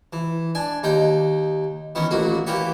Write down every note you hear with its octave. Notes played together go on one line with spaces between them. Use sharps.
E3
D4 G#5
D#2 D#4 G5
D#3 E3 B3 C#4
A1 A#2 F#4
E3 A#3 G4 B4 C#5